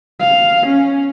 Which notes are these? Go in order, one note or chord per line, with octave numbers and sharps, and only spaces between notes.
F5
C#4